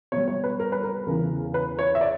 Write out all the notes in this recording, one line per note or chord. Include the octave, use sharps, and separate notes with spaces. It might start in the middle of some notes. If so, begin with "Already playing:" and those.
B2 G3 C#5
C#5
B4
A#4
B4
A#4
E2 C#3 E3 A#4
B4
C#5
E5
D5